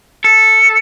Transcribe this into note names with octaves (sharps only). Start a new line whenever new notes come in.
A4